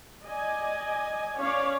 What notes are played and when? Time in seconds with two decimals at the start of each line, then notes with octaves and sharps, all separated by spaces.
0.22 D5 D#5 G#5
1.36 C#4 C#5 D5 F5